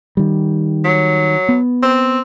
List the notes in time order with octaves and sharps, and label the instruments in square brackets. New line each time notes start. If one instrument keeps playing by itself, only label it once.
[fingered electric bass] D#3 G3
[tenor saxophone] F#3
[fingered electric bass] B3
[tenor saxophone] C4